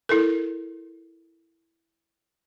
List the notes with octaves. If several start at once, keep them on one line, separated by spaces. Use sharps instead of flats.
E4 A4 A#4